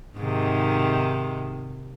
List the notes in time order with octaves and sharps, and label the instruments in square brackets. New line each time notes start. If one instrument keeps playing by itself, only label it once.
[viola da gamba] G#2 C3 D#3